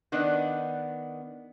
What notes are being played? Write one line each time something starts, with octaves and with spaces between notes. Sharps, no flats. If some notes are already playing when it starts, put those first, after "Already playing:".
D#3 B3 D4 D#5